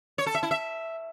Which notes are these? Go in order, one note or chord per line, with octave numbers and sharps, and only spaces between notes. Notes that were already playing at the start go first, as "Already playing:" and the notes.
C#5
A4
E5
E4
E5